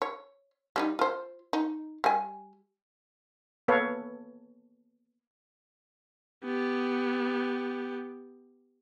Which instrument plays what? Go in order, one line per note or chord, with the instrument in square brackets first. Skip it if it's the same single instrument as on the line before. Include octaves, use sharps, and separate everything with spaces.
[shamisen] C#5
G3 D4 D#4
F4 C5
D#4
G3 G#5
[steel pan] A#3 B3 A4 B4 C#5 F5
[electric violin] B3 G4